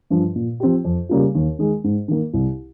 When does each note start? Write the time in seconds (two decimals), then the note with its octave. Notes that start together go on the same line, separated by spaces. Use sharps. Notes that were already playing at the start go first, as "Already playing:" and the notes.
0.10 G2 F3
0.35 A#2
0.60 F3 C4 G4
0.84 F2
1.09 C#3 G3 A#3 F4
1.35 D#2
1.59 D#3 G#3
1.84 G#2
2.08 D#3 A#3
2.34 C2